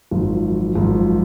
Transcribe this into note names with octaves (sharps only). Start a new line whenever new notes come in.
G#1 F#2 F3
G#1 F#2 F3